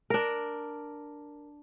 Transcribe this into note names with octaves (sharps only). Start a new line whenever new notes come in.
D4 A#4